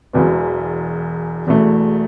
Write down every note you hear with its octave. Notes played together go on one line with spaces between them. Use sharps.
E1 E2 B2 F#3 B3
E1 E2 B2 A3